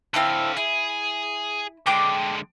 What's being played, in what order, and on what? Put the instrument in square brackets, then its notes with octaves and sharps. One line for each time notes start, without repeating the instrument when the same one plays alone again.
[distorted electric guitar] D3 F5 [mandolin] C4 E4 A4
[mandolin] E4 [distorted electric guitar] G#4
[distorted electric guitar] D3 G#3 [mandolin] D4 G5 D6